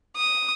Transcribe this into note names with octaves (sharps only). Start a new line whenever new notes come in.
D#6